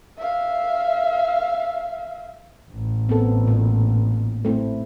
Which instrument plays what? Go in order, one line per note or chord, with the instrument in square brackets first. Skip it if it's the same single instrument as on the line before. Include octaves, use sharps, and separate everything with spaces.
[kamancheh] E5 F5
[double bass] A1
[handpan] B3 C4 A4
A#2
A3 C4 E4